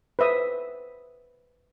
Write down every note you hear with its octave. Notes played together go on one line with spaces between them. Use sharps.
B4 C5 E5 D#6